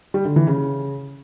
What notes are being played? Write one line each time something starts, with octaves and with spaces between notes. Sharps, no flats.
G3
D3
E3
C#3